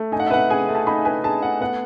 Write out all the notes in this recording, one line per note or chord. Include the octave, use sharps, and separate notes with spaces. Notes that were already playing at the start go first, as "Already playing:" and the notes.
Already playing: A3
D#4 G#5
F#5
E5
B4 F#5
G#4 G#5
A3
A5
D#4 B5
B4 G#5
G#4 A5
A3 F#5
B3 F#5